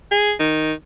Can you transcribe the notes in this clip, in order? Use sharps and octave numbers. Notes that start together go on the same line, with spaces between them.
G#4
D#3